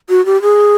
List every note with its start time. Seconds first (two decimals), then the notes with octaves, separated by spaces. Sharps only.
0.10 F#4
0.26 G4
0.42 G#4